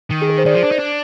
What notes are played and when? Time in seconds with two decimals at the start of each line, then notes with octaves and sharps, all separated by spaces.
0.11 D#3
0.22 G#4
0.29 A#4
0.38 C5
0.46 D#3 D5
0.54 F3
0.63 D4
0.71 D#4
0.79 D4